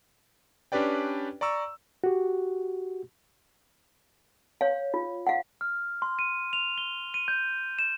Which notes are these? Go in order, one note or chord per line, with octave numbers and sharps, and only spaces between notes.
C#4 D4 G4 B4 D5 G5
D5 A#5 C#6 E6
F#4 G4
C#5 F5
F4
F5 F#5
F6
C6
D#7
F7
G7
D#7
G6
E7